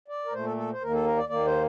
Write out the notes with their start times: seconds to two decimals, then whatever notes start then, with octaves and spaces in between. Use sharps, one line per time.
0.08 D5
0.25 A#4
0.32 A#2 A3 C5
0.44 A4
0.57 A4
0.72 C5
0.81 D#2 D#3 A#3 A#4
0.93 A4
1.05 A#4
1.16 D5
1.29 D#2 D#3 A#3 D5
1.45 C5